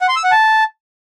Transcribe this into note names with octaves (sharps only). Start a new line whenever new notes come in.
F#5
C6
E6
F#5
A5